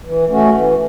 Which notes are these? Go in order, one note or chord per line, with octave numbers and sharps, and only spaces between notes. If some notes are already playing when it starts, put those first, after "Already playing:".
E3
A3 C#4 F#4
E3